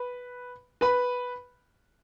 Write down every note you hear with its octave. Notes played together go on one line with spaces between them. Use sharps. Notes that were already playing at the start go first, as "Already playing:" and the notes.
Already playing: B4 B5
B4 B5